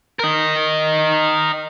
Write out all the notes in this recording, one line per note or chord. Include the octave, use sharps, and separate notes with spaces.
A#4 D#5